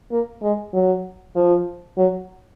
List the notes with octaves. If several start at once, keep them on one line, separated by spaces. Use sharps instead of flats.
A#3
G#3
F#3
F3
F#3